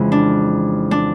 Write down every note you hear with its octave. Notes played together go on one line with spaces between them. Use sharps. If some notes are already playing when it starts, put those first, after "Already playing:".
Already playing: F2 C#3 E3 G#3
D4
D4